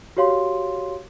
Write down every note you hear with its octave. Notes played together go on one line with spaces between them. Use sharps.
F#4 G4 C#5 F5 C6